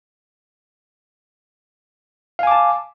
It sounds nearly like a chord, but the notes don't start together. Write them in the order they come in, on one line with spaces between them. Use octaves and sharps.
F5 G#5 D6 A5